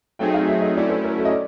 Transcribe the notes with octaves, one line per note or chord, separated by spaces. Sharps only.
F#3 A3 C4 D#4 G#4 G5
F5
E5
D#5
F#3 A3 C#4 E4 D5
C5
A#4
A4
D#5
D5